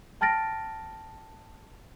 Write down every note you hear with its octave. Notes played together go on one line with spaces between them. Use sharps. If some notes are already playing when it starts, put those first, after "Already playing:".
G5 A5 F6 A6 A#6 D7